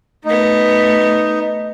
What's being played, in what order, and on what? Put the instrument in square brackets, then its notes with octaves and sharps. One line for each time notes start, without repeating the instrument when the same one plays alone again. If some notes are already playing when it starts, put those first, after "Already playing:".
[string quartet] A3 B3 [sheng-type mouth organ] D#4